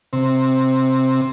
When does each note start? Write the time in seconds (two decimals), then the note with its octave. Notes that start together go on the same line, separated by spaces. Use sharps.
0.13 C3